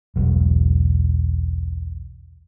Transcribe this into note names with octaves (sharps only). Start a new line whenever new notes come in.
E1 B1